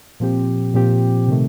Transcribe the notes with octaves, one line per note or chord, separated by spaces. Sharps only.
A#2 F3 C4 G4
A#2 F3 C4 G4
C3 D#3 A3